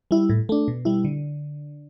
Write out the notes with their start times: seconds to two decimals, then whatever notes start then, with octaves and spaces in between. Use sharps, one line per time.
0.11 G3 E4
0.30 A2
0.49 A3 D4
0.68 B2
0.85 G3 E4
1.05 D3